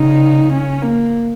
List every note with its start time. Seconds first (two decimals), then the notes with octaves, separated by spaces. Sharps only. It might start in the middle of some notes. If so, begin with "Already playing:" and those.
Already playing: C#3 D#4
0.53 C#4
0.83 A#3